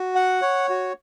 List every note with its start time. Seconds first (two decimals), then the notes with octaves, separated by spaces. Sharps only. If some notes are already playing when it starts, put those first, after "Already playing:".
Already playing: F#4
0.15 F#5
0.42 C#5
0.70 F#4